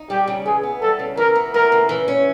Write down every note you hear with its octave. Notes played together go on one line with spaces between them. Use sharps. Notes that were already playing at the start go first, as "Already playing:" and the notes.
Already playing: D#4
G3 G4
C#3
E3 G#4
B3
G3 A4
C#3
E3 A#4
B3
A3 A#4
C#3
E3
C#4